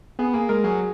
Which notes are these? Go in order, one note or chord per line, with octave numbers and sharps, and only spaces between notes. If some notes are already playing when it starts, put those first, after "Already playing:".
B3 G#4
A#3 G#4
G#3 A#4
F#3 G#4